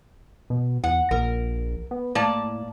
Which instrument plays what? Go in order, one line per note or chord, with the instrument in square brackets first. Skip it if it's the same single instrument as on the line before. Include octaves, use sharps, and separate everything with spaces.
[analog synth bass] B2
[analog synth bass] E2 [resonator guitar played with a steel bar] F#5
[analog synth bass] A#1 [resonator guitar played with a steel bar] A#4
[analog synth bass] B3
[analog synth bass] A2 [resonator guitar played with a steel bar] A#3 D5 A5